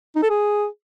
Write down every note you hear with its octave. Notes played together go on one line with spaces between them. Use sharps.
D#4
A4
G#4